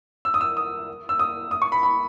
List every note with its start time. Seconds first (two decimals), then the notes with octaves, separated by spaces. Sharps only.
0.25 E6
0.34 D#6
0.41 E6
0.57 D#6
1.09 E6
1.19 D#6
1.51 D#6
1.62 C#6
1.72 B5
1.83 B5